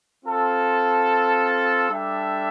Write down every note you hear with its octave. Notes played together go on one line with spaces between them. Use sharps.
C4 F4 A4
G3 D4 A4 E5 G5